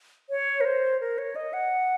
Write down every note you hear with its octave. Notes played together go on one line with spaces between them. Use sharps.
C#5
A#4
C5
A#4
C#5
D#5
F#5